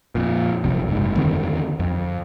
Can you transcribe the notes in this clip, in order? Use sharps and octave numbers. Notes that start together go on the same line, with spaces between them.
F2 A#2
F1 B1 C3 F3
F#1 G#2
E2 D3 D#3 C4
F2